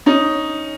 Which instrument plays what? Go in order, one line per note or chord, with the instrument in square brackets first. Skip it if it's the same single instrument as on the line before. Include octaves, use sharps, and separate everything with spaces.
[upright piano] C#4 D#4